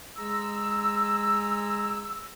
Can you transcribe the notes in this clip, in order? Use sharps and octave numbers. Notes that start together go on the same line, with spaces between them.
G#3 G#4 A#5 E6